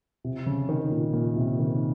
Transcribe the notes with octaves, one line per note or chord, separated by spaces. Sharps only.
C3
C#3
D#3
A#2
A#2
C3
D#3